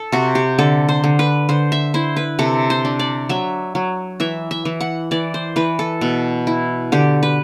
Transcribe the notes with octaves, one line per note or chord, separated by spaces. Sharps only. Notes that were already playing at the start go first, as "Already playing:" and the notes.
Already playing: A4
C3 F#4
G4
D3 A4
C5
D3
B4
D3 C5
E5
E4 C5
B4
C3 A4
C5
D4
D5
F#3 E5
F#3
E3 E5
E5
E3
F#5
E3 D5
C5
E3 B4
A4
B2
E4
D3 G4
B4